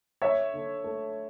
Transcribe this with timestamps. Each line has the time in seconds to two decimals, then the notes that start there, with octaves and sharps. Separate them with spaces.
0.22 D3 C#5 E5
0.54 D3
0.84 A3